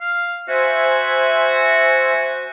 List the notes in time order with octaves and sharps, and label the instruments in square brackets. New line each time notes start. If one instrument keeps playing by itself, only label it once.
[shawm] F5
[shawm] F#4 [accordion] C5 E5 G#5